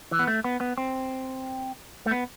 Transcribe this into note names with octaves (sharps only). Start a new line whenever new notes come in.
E3
B3
A3
B3
B3
C4
A3
B3